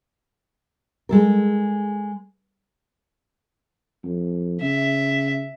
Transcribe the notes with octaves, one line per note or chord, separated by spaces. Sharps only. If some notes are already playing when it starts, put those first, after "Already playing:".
G#3 A4 A#4
F2
C#3 E5